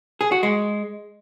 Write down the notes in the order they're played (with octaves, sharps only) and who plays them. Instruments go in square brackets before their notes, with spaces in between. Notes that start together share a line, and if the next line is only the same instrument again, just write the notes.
[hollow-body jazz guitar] G#4
F#4
G#3